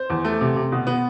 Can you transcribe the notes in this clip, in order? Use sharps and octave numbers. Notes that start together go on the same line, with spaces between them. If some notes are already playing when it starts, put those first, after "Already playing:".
Already playing: C5
E2
A3
C3
C3
B2
B3